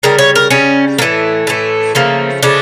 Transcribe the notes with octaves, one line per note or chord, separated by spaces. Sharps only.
C#3 G3 A#4
C#5
A#4
C#3 G3 C#4
A2 E3 A3 A#3
A2 E3 A3
C#3 F3 A3 A#3
C#3 F3 A3 D4